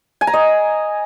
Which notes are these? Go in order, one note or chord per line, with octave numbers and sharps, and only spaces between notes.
G#5
A#5
D#5